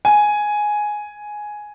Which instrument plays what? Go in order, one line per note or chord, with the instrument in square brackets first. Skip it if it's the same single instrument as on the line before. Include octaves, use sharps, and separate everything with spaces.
[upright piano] G#5